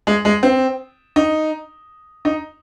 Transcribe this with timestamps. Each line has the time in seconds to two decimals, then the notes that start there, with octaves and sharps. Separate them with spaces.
0.07 G#3
0.25 G#3
0.43 C4
1.16 D#4
2.25 D#4